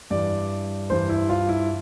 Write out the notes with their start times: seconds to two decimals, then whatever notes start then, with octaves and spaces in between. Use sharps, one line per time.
0.10 G2 E3 D5
0.90 G2 E3 C5
1.09 E4
1.29 F4
1.49 E4